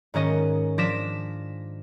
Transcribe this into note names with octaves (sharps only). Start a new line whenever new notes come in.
G#2 D#3 C#4 D#5
F3 D4 D6 A#6 B6 E7